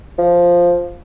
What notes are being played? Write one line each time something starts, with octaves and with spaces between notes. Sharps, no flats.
F3